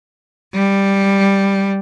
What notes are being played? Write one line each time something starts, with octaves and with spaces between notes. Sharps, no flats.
G3